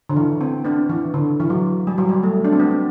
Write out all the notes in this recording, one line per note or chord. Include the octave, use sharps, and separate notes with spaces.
D3
E3
C4
B3 D4
E3
D3
E3
F#3
G3
F#3
G3
A3
D4
C4
B3